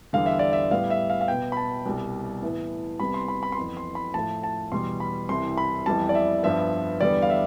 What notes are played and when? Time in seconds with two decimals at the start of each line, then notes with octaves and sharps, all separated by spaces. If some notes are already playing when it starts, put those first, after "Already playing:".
0.13 E2 D3 G3 F5
0.26 E5
0.39 D5
0.53 E5
0.71 A2 G3 B3 F5
0.90 E5
1.10 F5
1.21 F5
1.28 B2 B3 G5
1.52 B5
1.57 A5
1.85 C2 B2 G3
2.42 A2 E3 B3
3.00 C2 C3 G3 B3 B5
3.14 C6
3.28 B5
3.43 B5
3.52 C6
3.57 F2 E3 B3 B5
3.77 C6
3.95 B5
4.14 A2 F3 A3 A5
4.44 A5
4.72 E2 B2 G3 C6
5.00 B5
5.29 C2 C3 E3 C6
5.57 B5
5.86 F2 E3 G3 B3 A5
6.09 D5
6.15 E5
6.43 G2 F3 B3 E5
7.00 E2 D3 G3 B3 D5
7.22 F5
7.30 E5